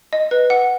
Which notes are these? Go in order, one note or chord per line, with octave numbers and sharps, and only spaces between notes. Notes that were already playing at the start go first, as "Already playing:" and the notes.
D#5
B4
F#5